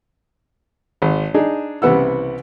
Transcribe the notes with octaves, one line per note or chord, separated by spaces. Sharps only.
G#1
D4 D#4 G#4
C2 C#3 E3 B3 F#5 E6